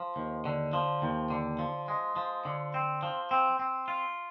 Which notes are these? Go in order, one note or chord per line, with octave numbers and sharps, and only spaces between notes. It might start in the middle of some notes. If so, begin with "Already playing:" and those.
Already playing: F3
D#2
D3
F3
D#2
D3
F3
G#3
F3
D3
C4
F3
C4
C4
F4